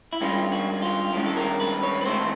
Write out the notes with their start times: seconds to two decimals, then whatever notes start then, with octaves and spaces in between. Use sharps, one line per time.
0.13 E4
0.21 G2 D#3 G#3 C#4 F4
0.52 F#4
0.82 F4
1.13 G2 D#3 G#3 C#4 E4
1.26 A4
1.37 A#4
1.60 B4
1.83 C#5
2.01 B4
2.05 G#2 D#3 F#3 A3 C4 C5